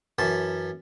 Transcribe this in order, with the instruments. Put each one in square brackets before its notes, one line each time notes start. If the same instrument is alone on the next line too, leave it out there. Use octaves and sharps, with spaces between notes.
[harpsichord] F#2 E3 A5